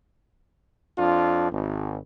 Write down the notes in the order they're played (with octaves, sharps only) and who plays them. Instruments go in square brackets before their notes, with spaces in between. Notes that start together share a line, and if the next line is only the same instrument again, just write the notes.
[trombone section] F2 D4 F4
G#1